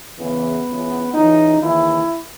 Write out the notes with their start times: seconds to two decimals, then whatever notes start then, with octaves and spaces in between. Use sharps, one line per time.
0.17 E2 C#3 E3 B3
0.66 C#2 C#3 E3
1.13 C#2 C#3 E3 D#4
1.61 D#2 C#3 E3 E4